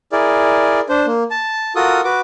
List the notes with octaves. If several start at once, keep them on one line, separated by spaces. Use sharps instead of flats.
E4 G#4 A#4 D5
D4 C5
A#3
A5
F4 F#4 A4 A#4 D#6
F#4 B4 D6